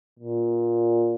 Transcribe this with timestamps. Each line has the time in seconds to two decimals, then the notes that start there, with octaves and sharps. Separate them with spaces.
0.19 A#2